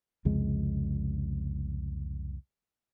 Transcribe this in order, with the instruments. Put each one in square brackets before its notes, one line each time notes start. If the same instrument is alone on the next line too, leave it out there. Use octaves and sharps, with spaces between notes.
[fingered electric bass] C2 F2 C#3 G#3